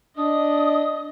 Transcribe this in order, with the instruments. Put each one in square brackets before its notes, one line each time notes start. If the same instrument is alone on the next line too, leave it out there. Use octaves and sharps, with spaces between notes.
[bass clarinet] D4 [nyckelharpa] D#5 [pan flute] D#6